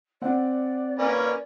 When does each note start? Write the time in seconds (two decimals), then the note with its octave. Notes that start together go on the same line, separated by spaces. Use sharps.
0.22 C4 D5 F#5
0.99 A#3 C#4 B4